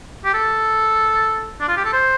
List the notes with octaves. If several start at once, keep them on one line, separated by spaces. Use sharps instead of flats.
G4
A4
D4
F4
G4
A4
C5